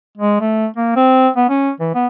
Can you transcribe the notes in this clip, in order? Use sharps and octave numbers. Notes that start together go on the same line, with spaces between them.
G#3
A3
A#3
C4
B3
C#4
E3
B3